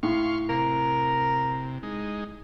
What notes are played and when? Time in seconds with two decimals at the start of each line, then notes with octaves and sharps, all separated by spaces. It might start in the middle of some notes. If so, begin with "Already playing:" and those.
0.03 A2 F5 C6 C#6
0.49 C3 A#4
1.83 G#3 D#4